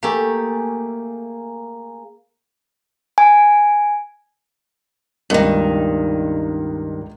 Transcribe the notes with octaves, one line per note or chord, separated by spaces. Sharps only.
A3 A#3 G4 G#4 C#6
G#5
C#2 G2 D#3 A#3 D#5